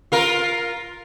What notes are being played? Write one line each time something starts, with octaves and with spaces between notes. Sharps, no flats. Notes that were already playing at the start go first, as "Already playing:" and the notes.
F4 A#4